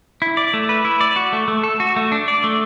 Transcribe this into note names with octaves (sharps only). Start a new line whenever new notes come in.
E4
D5
A3
B4
E4
D5
F#4
A3
A3
A4
F#4
A3
D4
D5
A3